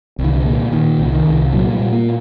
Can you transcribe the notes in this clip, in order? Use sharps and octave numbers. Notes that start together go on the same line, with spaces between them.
C2
D#3
D3
A#2
A#2 D#3
C2
D#3
C2
A#2 F#3
G3
A#2
A#3